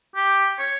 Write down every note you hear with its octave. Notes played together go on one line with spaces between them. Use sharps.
G4
C#5